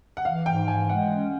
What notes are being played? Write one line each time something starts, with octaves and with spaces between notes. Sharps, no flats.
F#5
E3 F5
G#2 G5
E3 G#5
G#3 F#5
C#4